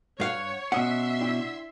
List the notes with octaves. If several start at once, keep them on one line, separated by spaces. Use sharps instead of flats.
G2 C#5 F5 F#5
B2 C#4 E5 F#5 C6 D#6 E6 C#7
D4 E4 G5